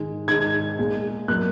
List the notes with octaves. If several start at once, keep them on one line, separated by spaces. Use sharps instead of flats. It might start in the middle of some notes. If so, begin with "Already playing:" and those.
Already playing: G#2 D#3 G#3
G#2 D#3 G#3 G#6
A#2 G#3
A#2 F#3 A#3 F#6